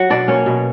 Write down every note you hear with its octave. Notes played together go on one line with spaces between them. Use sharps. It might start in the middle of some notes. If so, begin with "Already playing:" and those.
Already playing: F#3 F#4 F#5
B2 D4 D5
A#3 C#4 C#5
B2